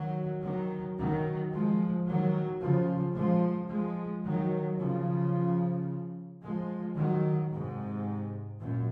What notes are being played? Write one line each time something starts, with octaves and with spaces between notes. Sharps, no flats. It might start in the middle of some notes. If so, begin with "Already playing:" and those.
Already playing: D#3 F#3
D#3 F#3
D#3 F#3
F3 G#3
D#3 F#3
C#3 F3
F3 G#3
F3 G#3
D#3 F#3
C#3 F3
F3 G#3
D#3 F#3
G#2 C3
F#2 A#2